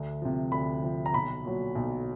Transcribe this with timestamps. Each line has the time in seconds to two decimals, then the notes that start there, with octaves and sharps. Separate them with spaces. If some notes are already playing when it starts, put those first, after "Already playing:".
Already playing: D2
0.22 C3 F3
0.52 D2 B5
0.84 C3 F3
1.06 A#5
1.13 B1 B5
1.45 A#2 F#3
1.75 B1